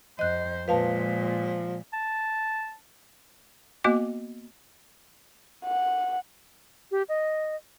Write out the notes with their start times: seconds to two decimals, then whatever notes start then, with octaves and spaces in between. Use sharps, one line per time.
0.19 F2 C5 D#5 F#6
0.68 A#2 F3 G#3 B4 F5 A5
1.93 A5
3.84 A#3 B3 F#4 D#5 G#5 D6
5.65 F#5
6.91 G4
7.09 D#5